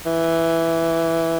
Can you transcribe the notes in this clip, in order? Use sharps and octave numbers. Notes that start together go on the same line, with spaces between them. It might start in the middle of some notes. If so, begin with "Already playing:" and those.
E3